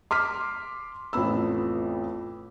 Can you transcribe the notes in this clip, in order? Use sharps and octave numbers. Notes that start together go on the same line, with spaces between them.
C6 D6 F6 B6
A1 F2 B3 B5 E6